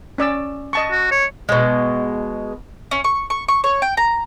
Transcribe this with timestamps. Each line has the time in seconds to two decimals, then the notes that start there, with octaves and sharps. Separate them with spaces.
0.18 C#4 D5 E6
0.73 D#5 A5 C#6
0.91 F#4
1.12 C#5
1.49 B2 G#3
2.91 C#4
3.04 C#6
3.30 C#6
3.49 C#6
3.64 C#5
3.82 G5
3.97 A#5